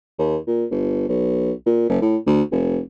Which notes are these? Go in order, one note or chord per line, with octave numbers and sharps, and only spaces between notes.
D#2
A#2
G1
B1
A#2
F#1
A2
D2
F1